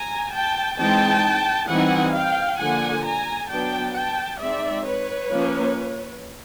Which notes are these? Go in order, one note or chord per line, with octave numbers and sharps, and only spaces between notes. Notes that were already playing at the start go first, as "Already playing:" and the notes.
Already playing: G#5 A#5
G5 A5
E3 G#3 C4 D#4 G5 A5
E3 G3 C4 D#4 F#5 G#5
F5 G5
D3 F3 A#3 F#5 G#5
G#5 A#5
F#3 B3 D4 G5 A5
G5 A5
G#3 C4 D#4 D5 E5
B4 C#5
F3 A#3 C#4